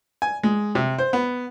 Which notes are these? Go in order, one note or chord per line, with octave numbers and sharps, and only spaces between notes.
G#5
G#3
C3
C5
B3